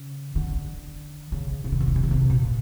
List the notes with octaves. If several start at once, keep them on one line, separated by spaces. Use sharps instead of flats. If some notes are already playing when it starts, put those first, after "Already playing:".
Already playing: C#3
D3
C#3
C3
C#3
C3
C#3
C3
C#3
C3
A#2